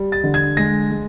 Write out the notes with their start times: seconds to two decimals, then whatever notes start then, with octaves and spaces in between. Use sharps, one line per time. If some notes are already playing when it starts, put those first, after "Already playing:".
Already playing: G3
0.12 A6
0.24 D3
0.34 G#6
0.57 G#3 A#6
0.91 G#3